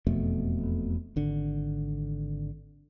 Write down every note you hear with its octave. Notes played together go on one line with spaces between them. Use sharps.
E1 F2 B2 A3
G#1 D3